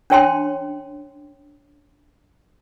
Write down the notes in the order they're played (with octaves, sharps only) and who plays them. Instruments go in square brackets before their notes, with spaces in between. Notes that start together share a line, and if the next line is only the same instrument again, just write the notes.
[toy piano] C#4 D4 C#5 G5 A5 C6